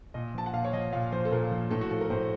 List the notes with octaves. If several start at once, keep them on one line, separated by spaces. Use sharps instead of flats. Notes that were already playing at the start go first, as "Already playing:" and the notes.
A#2 D#5
F3 A5
F#5
A#2 F5
C#5
F3 D#5
A#2 F5
F3 C5
A4
A#2 A#4
F3
A2 A4
F#4
F3 A4
A#4
A2 C5